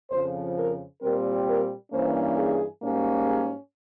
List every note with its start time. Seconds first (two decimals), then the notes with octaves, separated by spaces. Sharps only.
0.11 F2 C#3 F3 C5
0.56 A#4
1.01 A#2 G3 C4 A#4
1.47 A#4
1.92 G2 E3 A#3 C#4 C5
2.37 G#4
2.82 G#2 G3 A#3 C#4
3.27 G#4